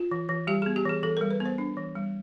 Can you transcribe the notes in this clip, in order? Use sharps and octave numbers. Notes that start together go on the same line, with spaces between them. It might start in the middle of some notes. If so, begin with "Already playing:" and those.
Already playing: F4
E3
E3
G3 G4
B3 G#4
G4
E3 G#4
E3 A4
G3 A#4
B4
B3
C5
D4
E3
G3